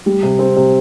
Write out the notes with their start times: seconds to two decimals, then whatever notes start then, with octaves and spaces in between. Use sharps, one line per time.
0.06 G3
0.23 C3
0.39 C4
0.56 C3